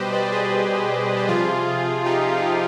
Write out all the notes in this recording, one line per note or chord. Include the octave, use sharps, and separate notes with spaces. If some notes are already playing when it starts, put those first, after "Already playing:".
Already playing: B2 G3 G4 B4 C5 D#5
B4 D5
G#4 C5
G4
C3 F3 F4 G#4
D#4 G4